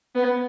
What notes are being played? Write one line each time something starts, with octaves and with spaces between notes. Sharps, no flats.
B3